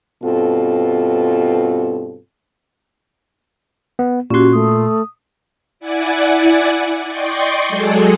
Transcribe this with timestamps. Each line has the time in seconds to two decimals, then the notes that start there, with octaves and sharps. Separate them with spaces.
0.23 G2 B2 C4 F4 A4
3.99 B3
4.30 A#2 C#4 F#4 G4 C6
4.53 A3 D#6
5.80 E4 D5 F#5 G#5
7.08 D5 D#5 G5 C6 C#6
7.68 F#3 G#3 G#4 A4